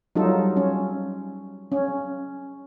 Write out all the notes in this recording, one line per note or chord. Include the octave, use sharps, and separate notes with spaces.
F#3 G3 D#4 F4 A4
C#4
C#4